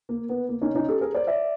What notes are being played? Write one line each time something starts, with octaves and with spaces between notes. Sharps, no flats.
A#3
B3
A#3
C#4 D#4
C#4 D#4
G4 A4
G#4 A#4
C5 D5
D5 E5